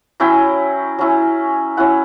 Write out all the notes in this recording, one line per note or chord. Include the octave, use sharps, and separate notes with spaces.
F#3 C#4 E4 G5
F#3 C#4 E4
F#3 C#4 E4 F#5